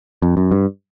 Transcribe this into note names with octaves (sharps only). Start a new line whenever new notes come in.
F2
F#2
G2